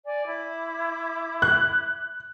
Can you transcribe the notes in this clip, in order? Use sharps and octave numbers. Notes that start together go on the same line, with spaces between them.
D5 G#5
E4 B5 D6
F#6